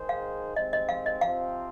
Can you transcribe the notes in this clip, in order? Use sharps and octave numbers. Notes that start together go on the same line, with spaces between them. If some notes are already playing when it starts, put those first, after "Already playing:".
Already playing: D#3 G#3 D#4 G#4 C5
F5
C3 D#3 G#3 C4 D#5
D#5
F5
D#5
C3 F3 C4 F4 F5